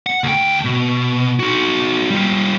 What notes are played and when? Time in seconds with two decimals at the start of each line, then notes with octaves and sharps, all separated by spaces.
0.06 F#5
0.24 D2 G5
0.65 B2
1.40 D#4 F#4
2.10 G3 F4